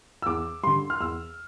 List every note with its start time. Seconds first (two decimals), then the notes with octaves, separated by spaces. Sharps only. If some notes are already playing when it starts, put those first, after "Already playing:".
0.22 E6
0.26 E2 D6
0.63 D3 G3 C6
0.90 F6
1.00 E2 E6